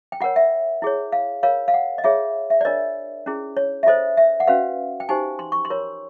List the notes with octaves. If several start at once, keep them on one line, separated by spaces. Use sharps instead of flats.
G5
F4 A#4 C#5 F#5
E5
E4 G#4 C#5
F5
F4 A#4 C#5 F5
F5
F#5
D#5
F4 G#4 C#5 E5
E5
D5
D4 F4 A#4 C#5 D#5
C#4 E4 G#4
C#5
E5
F4 A4 C5 D#5
E5
F#5
C#4 F#4 B4 F5
G5
D#4 G4 C5 G#5
C6
C#6
C6
F4 A#4 C#5